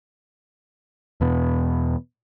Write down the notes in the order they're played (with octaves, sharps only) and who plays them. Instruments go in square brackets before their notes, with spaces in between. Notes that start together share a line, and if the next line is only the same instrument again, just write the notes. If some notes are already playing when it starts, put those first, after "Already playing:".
[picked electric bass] E2 B2